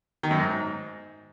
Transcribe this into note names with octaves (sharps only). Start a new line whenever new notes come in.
D#3
F#2
G#2